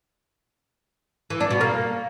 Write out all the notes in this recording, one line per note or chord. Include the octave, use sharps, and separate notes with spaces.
E3
D4
B2
A#3